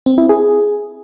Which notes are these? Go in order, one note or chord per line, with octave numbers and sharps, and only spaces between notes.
C4
E4
G#4